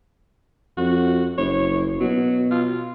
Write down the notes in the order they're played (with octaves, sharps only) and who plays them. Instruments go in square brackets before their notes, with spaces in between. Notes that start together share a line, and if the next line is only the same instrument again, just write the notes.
[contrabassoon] F2 [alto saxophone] F#4
[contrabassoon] F#1 [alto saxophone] C#5
[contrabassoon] B2 [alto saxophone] F#3
[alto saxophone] F4